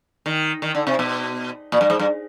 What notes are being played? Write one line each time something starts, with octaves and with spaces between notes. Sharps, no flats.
D#3
D#3
D3
C3
B2
A#2
G2
G#2
G2